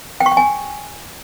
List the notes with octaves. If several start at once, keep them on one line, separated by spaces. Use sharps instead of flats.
G5
C#6
G5
G#5